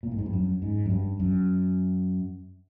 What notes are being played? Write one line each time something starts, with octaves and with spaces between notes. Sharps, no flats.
A#2
A2
G#2
G2
F#2
G#2
F#2
G2
F#2